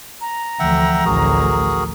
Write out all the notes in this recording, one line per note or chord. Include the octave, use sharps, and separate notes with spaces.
A#5
D2 E3 F3 E5 F#5 G5
A1 D2 F#4 G#4 A#4